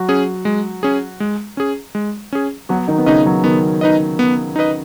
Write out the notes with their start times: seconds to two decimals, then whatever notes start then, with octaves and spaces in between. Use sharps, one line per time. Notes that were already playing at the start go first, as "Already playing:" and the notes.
Already playing: F#3 F#4
0.09 C#4 G#4
0.45 G#3
0.83 C#4 G#4
1.20 G#3
1.57 C#4 G#4
1.95 G#3
2.33 C#4 G#4
2.69 F#3 B3 F#4
2.88 D#3 D#4
2.98 B3
3.06 C#3 C#4 D#4 B4 D#5
3.26 F#3
3.44 D#3 B3
3.81 D#4 B4 D#5
4.19 B3
4.56 D#4 B4 D#5